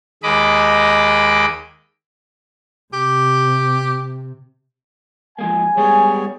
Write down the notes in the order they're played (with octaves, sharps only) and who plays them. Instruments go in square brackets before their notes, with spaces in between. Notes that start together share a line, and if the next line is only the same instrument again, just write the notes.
[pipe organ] D#2 G#3 D#5 B5 D6
[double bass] C3 [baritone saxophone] G4
[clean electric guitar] F3 G#3 A#3 [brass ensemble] G#5
[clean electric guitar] G3 G#3 B3 [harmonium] G#4 C#5